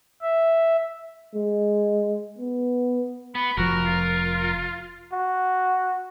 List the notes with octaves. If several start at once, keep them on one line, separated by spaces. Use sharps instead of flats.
E5
G#3
B3
B3 B5
F1 F3 F#4 A#4
F4
F#4